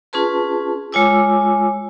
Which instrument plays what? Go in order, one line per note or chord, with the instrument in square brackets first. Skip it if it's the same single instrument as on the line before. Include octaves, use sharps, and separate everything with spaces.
[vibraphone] C#4 F4 G#4 B4 A5 C6
G#3 F4 C#5 G#5 D6 E6